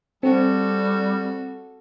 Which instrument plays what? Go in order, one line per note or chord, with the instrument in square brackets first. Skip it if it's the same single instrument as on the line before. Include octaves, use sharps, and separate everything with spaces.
[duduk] G3 [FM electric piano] C4 [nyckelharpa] F#4 A4